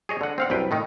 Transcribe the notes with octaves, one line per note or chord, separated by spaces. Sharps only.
G#4 C#5 D#5
D3 F#5
C4 F5 F#5
C2 F#2 B4 G5
A2 D#3 D#4